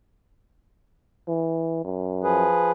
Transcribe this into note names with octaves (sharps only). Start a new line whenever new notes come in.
E3
F#2
F3 G#4 B4